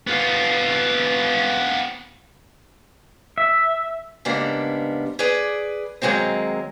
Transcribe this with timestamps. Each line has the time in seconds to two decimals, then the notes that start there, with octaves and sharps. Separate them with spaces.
0.07 B3 F4
3.38 E5
4.25 G#2 C#3 G3 A#3 B3 D4
5.19 G#4 B4 D5
6.02 D#3 F#3 G#3 A#3 C4